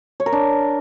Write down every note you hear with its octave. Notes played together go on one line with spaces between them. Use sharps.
C#5
A#4
D4